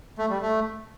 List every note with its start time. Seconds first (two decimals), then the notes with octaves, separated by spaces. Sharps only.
0.18 A3
0.30 G3
0.41 A3